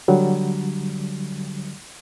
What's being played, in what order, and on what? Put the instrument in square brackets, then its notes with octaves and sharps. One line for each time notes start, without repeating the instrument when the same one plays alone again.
[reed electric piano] D3 F#3 G3